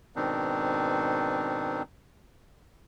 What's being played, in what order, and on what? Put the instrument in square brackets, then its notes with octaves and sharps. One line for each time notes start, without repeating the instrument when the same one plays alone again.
[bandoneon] G#2 B2 D#3 C4 D4 D#4